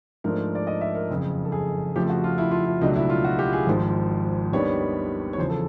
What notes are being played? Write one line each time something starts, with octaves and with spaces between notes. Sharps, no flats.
G#2 F3 A3 D4 A#4
D5
D#5
E5
A#4
F#1 F2 C#3
A4
G#4
F2 C#3 F3 A3 G4
F#4
F4
E4
F4
E4
C#2 B2 F#3 A3 D4 D#4
E4
F4
F#4
G4
G#4
G#1 G#2 F3
D#2 D#3 G3 B3 D4 C#5
C#5
E2 C#3 F3 C5
A4